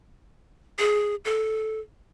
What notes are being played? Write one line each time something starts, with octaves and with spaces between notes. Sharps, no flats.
G#4
A4